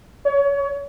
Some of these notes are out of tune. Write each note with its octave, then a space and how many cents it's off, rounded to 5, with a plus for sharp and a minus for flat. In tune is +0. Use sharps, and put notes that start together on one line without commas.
C#5 +30